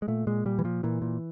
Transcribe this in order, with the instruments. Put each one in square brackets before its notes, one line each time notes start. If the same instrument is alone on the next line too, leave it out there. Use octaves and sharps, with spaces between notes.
[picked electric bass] G#3
A#2 A3
A#2 G#3
A#2 G3
E3
A#2 F3
A#2 E3
A#2